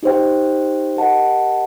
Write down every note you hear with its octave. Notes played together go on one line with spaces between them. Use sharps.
D#4 G4 C5 G5
G4 A#4 D#5 F#5 A5